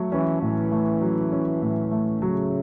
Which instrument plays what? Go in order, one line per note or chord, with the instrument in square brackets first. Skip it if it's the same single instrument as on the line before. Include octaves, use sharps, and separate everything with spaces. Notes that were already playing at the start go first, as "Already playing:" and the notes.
Already playing: [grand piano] F#3 A3
[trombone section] E3 [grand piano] C#4
[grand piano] A2 [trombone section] E3
[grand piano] A3
F#3
C#4
A2
A3
[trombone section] C#3 [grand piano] F#3